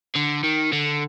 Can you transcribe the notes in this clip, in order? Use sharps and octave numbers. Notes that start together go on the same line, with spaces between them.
D3
D#3
D3